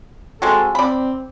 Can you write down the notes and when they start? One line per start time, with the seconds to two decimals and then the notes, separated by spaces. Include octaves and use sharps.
0.42 G#3 C4 F#4 A4
0.75 C4 D5 B5